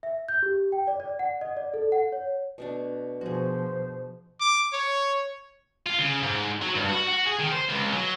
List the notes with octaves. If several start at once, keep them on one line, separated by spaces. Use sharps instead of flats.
E5
G6
G4
G5
D5
D5
F#5
D#5
D5
A4
F#5
C#5
B2 A3 D4
B2 F3 F#4 G#4 C5
D6
C#5
F4
C#3
G#2
F#3
G2
F#4
F#4
G#4
D#3
C5
C#2
F#3